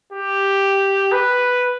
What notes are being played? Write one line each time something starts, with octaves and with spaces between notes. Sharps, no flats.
G4
B4